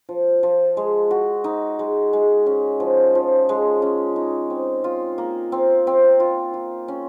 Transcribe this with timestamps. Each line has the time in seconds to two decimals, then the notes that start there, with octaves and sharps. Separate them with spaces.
0.09 F3
0.43 F3
0.77 G#3
1.11 F#4
1.44 D#4
1.79 G#3
2.13 G#3
2.46 C#4
2.80 F3
3.15 F3
3.49 G#3
3.82 C#4
4.16 D#4
4.50 C4
4.84 F4
5.18 A#3
5.52 C4
5.87 C4
6.20 F4
6.54 F4
6.88 C#4